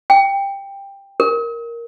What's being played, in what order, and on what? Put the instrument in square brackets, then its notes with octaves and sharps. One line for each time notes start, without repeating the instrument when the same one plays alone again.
[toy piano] G5
A#4